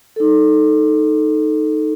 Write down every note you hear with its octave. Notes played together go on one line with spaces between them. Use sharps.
D#4 A4